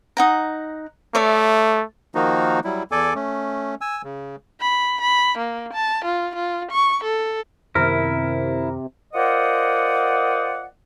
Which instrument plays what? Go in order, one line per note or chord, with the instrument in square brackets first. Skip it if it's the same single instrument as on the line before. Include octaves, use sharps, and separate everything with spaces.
[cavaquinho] D#4 F#5 A#5
[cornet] A3 [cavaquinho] C#5 D5 E5
[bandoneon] D#3 F3 A#3 D#4 F#4
F#3 G3 E4
E2 A4 D5 G#5 D6
A3 C#4
G#5 E6
C#3
[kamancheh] B5
B5
A#3
A5
F4
F4
C#6
A4
[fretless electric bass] F#2 D#3 B3 [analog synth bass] C3 [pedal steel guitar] E4 [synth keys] A#4
[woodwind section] F4 A#4 C5 D5 D#5 F#5